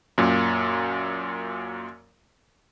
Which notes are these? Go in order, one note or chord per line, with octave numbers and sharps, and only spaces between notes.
F#2 A#2